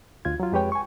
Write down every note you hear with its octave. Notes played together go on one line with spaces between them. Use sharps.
D2 F4 G#6
F#3 F4
F2 G#3 G4 B4 C#5 G5
G#5 C#6